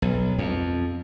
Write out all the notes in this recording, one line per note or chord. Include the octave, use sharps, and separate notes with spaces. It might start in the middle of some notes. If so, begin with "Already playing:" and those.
B1
F2